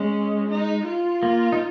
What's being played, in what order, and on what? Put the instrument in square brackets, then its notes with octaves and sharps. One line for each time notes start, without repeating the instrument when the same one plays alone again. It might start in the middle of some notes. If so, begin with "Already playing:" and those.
Already playing: [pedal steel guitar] G#3 [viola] C#4
[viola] D#4
F4
[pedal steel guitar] A#3
D#4